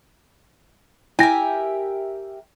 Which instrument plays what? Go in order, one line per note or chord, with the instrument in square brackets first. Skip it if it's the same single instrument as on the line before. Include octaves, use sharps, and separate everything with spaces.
[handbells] E4 A#6 [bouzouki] G4 A#4 E5 [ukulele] G#5